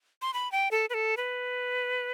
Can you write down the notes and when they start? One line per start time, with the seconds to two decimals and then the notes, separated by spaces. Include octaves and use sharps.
0.22 C6
0.34 B5
0.52 G5
0.71 A4
0.90 B4
0.94 A4
1.17 B4